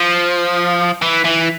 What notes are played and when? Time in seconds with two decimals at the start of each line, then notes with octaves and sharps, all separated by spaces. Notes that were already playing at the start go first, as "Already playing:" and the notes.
Already playing: F3
1.02 E3
1.25 E3